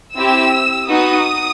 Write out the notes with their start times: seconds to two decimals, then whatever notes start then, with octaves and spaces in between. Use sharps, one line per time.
0.15 C4 E4 G4 E6
0.89 B3 D#4 F#4 D#6